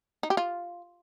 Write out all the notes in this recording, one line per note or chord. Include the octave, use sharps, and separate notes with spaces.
D#4
G4
F4